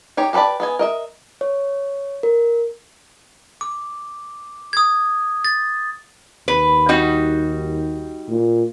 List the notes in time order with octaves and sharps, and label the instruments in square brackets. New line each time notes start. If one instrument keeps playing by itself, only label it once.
[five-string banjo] D#4 G4 C#5
G4 A4 B4 D5 A5
B3 D#5 G#5
A#4 D#5 E5
[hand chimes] C#5
A#4
[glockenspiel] D6
D#6 G#6
A6
[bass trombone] D#2 [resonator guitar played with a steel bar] B4
[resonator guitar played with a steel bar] G3 D#4 F#4
[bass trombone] A#2